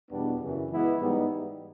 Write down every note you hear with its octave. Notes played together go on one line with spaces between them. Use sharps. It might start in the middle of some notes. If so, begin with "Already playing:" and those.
E2 B2 G3 B3 D4
F#2 C#3 E3
E3 G#3 B3 E4
G#2 E3 G3 B3 D#4